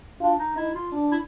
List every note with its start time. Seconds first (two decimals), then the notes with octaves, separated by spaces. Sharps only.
0.21 D4 F4
0.38 D#4
0.56 D#4 E4
0.75 F4
0.92 D4
1.11 E4